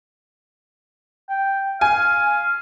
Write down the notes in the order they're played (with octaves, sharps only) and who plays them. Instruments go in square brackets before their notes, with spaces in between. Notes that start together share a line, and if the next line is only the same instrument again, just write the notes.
[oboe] G5
[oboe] F5 [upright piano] G#5